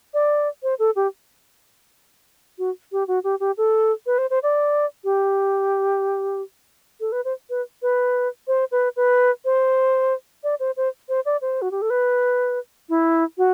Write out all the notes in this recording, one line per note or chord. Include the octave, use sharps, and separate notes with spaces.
D5
C5
A4
G4
F#4
G4
F#4
G4
G4
A4
B4
C5
C5
D5
G4
A4
B4
C5
B4
B4
C5
B4
B4
C5
D5
C5
C5
C5
D5
C5
F#4
G4
A4
B4
E4
F#4